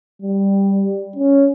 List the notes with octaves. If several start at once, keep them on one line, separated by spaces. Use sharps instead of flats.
G3
C#4